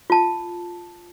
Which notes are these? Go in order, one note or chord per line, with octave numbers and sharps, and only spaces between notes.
F4 A5